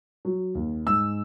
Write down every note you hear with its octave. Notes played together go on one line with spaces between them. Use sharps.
F#3
D#2
G#2 E6